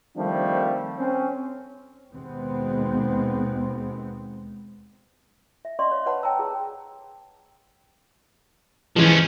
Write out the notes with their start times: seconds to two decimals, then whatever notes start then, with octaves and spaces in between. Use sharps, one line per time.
0.17 D#3 F3 G3 A3 C4 D4
0.98 C4 C#4
2.12 D#2 B2 G#3 B3 C4
5.65 E5
5.79 C#4 D5 D#5 F#5 C6 C#6
5.91 C#5 F5
6.06 B4 C#5 F#5 A5 B5
6.23 G5 A5 A#5 E6
6.39 G#4
8.96 E3 F3 G#3 C#4